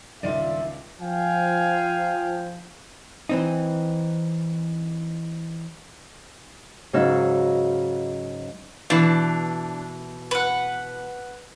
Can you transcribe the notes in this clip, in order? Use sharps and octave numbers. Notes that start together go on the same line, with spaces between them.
C#2 G2 D#3 F4 D5 E5
F3 F5 G5 G#5
E3 C4 D#4
G#2 C#3 F#3 D#4 E6
B2 E3 D4
B4 F#5